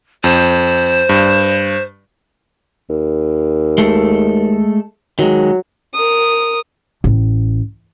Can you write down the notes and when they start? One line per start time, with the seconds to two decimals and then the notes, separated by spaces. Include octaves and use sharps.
0.24 F2 C5 E7
1.09 G2
2.89 D#2
3.78 G#3 A3 A4
5.19 D#3 F#3 G#3
5.94 A#4 D#6
7.04 A1